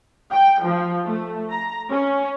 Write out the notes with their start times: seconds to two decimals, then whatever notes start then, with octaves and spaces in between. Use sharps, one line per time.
0.31 G5
0.64 F3
1.05 A3
1.50 A#5
1.89 C#4